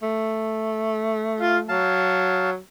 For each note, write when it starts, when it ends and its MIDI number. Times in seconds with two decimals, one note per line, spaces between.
0.03 1.81 57
1.40 1.57 65
1.40 1.58 77
1.69 2.58 54
1.69 2.50 77
1.69 2.50 81